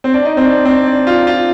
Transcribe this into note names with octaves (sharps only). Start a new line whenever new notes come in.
C4
D4
D#4
C4
D4
C4
D4
F4
F4